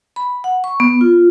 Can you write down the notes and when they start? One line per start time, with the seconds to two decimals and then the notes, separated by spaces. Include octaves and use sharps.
0.16 B5
0.44 F#5
0.64 C#6
0.80 B3
1.01 F4